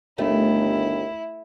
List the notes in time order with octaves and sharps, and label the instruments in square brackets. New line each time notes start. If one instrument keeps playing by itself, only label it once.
[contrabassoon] G1 [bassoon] D#2 [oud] A3 [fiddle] E4